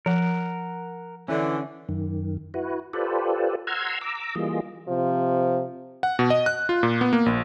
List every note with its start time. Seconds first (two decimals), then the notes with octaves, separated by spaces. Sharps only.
0.06 F3 A#4 F#5
1.28 D3 E3 C#4
1.89 F#2 D#3
2.54 E4 F#4 B4
2.93 F4 G4 A4 B4 C5 D5
3.67 F#5 A#5 C6 E6 F6 G#6
4.01 A#5 D6 E6
4.35 E3 G3 A#3 F4 G#4 D#5
4.88 C3 F3
6.03 F#5
6.19 B2
6.30 D#5
6.46 F#6
6.69 F4
6.83 A#2
7.01 B3
7.13 A#3
7.26 A#1